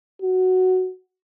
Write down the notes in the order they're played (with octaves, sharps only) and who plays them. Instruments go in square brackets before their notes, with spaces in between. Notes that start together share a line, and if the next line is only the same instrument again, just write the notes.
[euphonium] F#4